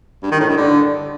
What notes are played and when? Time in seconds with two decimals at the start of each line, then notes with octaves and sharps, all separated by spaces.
0.23 G2
0.31 D#3
0.40 A2
0.48 G2
0.57 D3